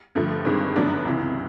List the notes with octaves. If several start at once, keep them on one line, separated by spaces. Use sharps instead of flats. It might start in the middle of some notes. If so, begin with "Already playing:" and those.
G2 D3 F3 A3
G1 G2 D#3 G#3 C4
F#2 D3 F#3 B3 D4
C#2 C3 E3